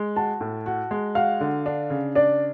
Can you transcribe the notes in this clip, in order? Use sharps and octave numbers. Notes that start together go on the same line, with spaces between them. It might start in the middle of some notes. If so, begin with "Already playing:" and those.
Already playing: G#3
F#4 A5
A2
F#4
G#3
F#4 F5
D3
D4
C#3
D4 D5